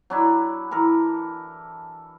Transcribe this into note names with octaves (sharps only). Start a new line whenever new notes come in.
F#3 D4 E4
E3 A4 A#4